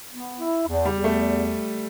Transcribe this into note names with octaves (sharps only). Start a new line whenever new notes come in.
B3
E4
E2
G3
E2
A3